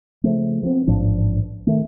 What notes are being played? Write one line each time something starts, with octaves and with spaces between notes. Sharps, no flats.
C#3 F3 A3
F3 B3 C4
A1 G#2 F3 D4
D#3 A3